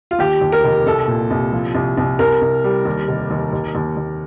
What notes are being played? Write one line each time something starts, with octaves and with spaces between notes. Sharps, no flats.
F4
D#2 G4
D#2
A#4
F1
C2 A4
A#2
C2
F3
C2
C2
C2 A#4
C2
G3
D#2
F1
D#2
D#2
D#2
D#2